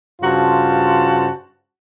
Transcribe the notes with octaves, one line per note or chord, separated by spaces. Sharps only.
G2 C#3 F4 F#4 C5 A5